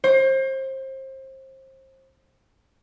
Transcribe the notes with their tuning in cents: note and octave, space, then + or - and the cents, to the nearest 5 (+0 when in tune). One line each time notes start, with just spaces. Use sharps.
C5 +30